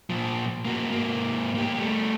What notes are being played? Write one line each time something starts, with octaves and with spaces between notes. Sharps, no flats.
A#2 F3
A#3 F#4
G#2 A#3
A#3 G4
G3 A3